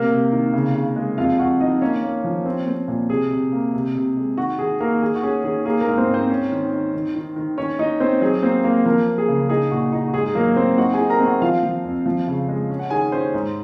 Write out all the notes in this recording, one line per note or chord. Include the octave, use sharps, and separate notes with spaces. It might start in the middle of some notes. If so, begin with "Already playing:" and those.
Already playing: C3 A#3 A#4
C3
D#3
C#3
C#3
G#3
F2 F4 F5
F2 F#4 F#5
D#3 D#4 D#5
A#3 C#4 C#5
A#3
F3
C4
C4
A#2
C3 G#4
C3
A#3
C3
C3
G#3
D#3 F#4
D#3 G#4
D#3 A#3 A#4
D#3 G#4
F#4
C#4 G#4
D#3 G#4
A#3 G#4
A#3 A#4
G#2
C4 C5
G#2
C4 C5
C#4
D#3
D#3
D#3
D#3
D#3
D#3 C#4 C#5
D#3 D#4 D#5
C4 C#4 C5
F#3 G#4
A#3 C4 C5
A#3 A#4
F3 A#3 A#4
A#3
G#4
C#3
D#4 G#4
A#2 F#4
D#4
F#4
G#2 G#4
G#4
F#3 A#3 A#4
C4 C5
D#4 F#4 F#5
G#4 G#5
D#4
A#4 A#5
C4
F#4 F#5
F3 F4 F5
F3
F2
F3
C#3
G#3
C#4
F#5
D#3 G#4 G#5
C#4 C5 C6
G#2